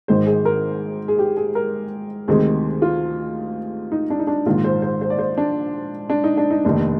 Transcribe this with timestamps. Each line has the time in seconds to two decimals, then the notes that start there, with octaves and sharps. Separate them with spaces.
0.08 G#1 G#2 D#3 G#3 C5
0.27 G#4
0.45 A#4
1.08 G#4
1.19 G4
1.37 G#4
1.55 A#4
2.28 D2 C3 D#3 G#3 G#4
2.82 F4
3.92 D#4
4.10 D4
4.19 D#4
4.27 D4
4.46 A#1 G#2 D#3 F4
4.64 C5
4.82 C5
5.01 C5
5.10 D5
5.19 C5
5.38 D4
6.10 D4
6.24 D#4
6.37 D4
6.51 D#4
6.65 F1 D#2 D#3 D4